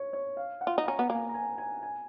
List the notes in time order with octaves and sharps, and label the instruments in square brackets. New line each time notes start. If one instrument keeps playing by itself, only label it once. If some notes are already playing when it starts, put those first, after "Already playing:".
Already playing: [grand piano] C#5
C#5
F5
F#5
[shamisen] F4
D#4
[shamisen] C#4 [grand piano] A#5
[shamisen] B3
[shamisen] A#3 [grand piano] G#5
[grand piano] A#5
G#5
G#5
G#5